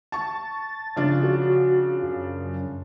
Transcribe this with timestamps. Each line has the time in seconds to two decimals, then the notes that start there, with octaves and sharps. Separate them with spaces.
0.12 A5 C#6 A6
0.96 C#3 F3 D4
1.23 F#4
2.03 F#2